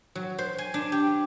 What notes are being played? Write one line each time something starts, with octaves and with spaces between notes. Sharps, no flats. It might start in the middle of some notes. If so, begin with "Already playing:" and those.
F#3
C5
G#5
D4
G4